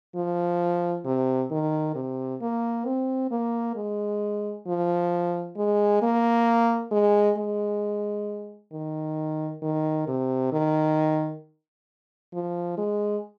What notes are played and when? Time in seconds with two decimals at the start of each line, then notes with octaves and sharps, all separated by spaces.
0.15 F3
1.05 C3
1.51 D#3
1.95 C3
2.41 A#3
2.85 C4
3.31 A#3
3.75 G#3
4.67 F3
5.57 G#3
6.02 A#3
6.91 G#3
7.37 G#3
8.72 D#3
9.62 D#3
10.08 C3
10.52 D#3
12.33 F3
12.78 G#3